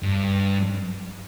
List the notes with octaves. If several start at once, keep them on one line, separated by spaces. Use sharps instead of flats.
G2